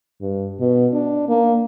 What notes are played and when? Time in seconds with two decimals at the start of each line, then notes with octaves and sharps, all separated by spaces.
0.21 G2
0.60 B2
0.93 D4
1.28 A#3